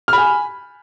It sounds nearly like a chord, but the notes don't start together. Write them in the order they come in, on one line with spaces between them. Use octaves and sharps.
F6 B5 G#5